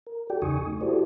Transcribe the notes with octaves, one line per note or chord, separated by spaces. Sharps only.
A#4
F#4 G4 A4 D5 G5
E2 C#3 D#4 G#5 C#6 D#6
A3
E4 F#4 G4 A4 C5 D5